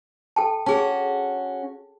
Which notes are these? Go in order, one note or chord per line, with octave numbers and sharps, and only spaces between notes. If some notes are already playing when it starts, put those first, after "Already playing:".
A4 G5 A5
C#4 F#4 G#4 A5